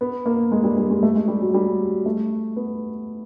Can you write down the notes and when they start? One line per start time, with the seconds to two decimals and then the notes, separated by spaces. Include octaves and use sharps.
0.01 B3
0.26 A#3
0.51 G#3
0.64 G3
0.78 G3
0.91 G#3
1.03 A3
1.15 G#3
1.28 G3
1.41 F#3
1.54 G3
2.06 A3
2.56 B3